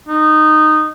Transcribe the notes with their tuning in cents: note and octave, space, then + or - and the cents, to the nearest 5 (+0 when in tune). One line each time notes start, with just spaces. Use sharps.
D#4 -15